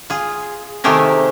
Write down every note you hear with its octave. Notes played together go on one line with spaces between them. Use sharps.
F4 G#4
C3 D#3 A3 G4 G#4 A#4